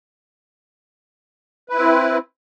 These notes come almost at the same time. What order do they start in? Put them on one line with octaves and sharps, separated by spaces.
B4 E4 C4